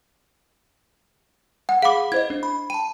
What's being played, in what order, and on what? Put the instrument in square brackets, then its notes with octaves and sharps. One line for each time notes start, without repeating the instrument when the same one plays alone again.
[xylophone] F#5
[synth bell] G#4 B5 [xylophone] F5 D6
[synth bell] E4 C5 D#5 [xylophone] G#6
[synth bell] D4
B5
[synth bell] G5 A5 [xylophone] D#7